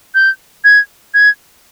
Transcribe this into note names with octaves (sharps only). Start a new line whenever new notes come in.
G6
G#6
G#6